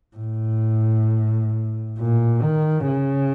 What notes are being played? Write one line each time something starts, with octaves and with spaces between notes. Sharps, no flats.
A2
A#2
D#3
C#3